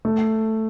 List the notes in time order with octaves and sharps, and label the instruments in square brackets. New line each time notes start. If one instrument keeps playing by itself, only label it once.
[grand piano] A3